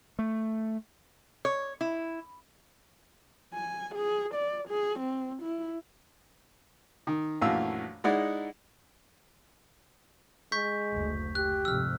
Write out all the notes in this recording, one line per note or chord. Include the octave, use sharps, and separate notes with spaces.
A3
C#5
E4
G#5
G#4
D5
G#4
C4
E4
D#3
A#1 F#2 E3 A3 F5 E6
G#3 D#4 E4 D5 F#5
G#3 C#6 G6 B6
F#1 D2
G4 F#6
F2 G#2 C3 E6 F6